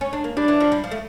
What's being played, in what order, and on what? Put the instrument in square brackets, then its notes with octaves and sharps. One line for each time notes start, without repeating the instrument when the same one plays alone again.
[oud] C#4
D4
A#3
[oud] G3 [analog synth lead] D4
[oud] E3
F3
G3
F3
A3